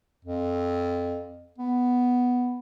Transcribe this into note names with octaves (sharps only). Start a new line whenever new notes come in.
F2
B3